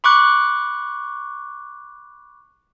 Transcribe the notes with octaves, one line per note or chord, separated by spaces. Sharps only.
B5 C#6 D6 F#6